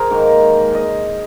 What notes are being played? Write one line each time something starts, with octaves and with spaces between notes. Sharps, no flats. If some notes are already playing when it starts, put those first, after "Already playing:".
Already playing: G#4 A#4 C5 A#5
G#2 D#3 A#3
D#5